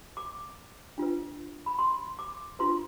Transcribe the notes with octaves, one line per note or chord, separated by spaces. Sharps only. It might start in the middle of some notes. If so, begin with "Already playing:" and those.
D6
D4 F4 B4
B5
C6
D6
D4 F4 B4 C6